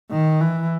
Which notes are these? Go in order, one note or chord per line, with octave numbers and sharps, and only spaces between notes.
D#3
E3